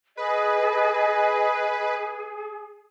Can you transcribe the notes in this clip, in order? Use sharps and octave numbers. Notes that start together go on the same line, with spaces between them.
G#4 B4 D#5